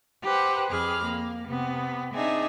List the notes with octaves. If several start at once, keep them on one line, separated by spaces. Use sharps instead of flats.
G4 B4 C5 F#5
F2 G#4 B5 D6 F6
A#3
C3 B3
C4 D4 D#4 G#4 E5 G#5